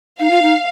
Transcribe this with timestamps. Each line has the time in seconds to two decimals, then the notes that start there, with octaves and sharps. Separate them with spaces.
0.20 D#4 F5
0.31 F4
0.42 D#4